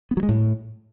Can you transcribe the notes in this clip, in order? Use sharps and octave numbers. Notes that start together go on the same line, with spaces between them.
B3
F#3
G#3
A2